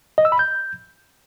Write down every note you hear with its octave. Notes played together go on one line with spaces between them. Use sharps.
D#5
E6
B5
G6